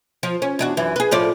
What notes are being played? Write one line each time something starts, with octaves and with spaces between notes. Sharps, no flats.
F3
C#4
E2 D4 F#4
F#2 E3
G#4 B4
A2 F3 D5